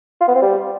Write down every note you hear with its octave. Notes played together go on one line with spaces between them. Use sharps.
F4
B3
C4
G3